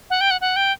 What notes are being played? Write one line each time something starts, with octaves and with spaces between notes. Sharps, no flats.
F#5
G5
F#5
F#5
G5